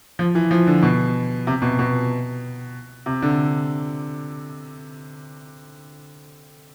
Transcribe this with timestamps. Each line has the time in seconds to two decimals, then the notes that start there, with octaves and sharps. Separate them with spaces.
0.19 F3
0.35 E3
0.51 F3
0.67 D3
0.83 B2
1.47 C3
1.62 B2
1.79 B2
3.06 C3
3.22 D3